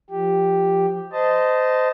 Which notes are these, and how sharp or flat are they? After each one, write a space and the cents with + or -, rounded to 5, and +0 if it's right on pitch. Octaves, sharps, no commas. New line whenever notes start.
F3 +0 G4 +0
C5 -25 D#5 +0 A5 +0